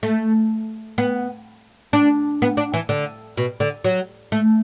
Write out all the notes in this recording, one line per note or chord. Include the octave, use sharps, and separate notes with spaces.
A3
B3
D4
B3
D4
E3
D3
B2
D3
F#3
A3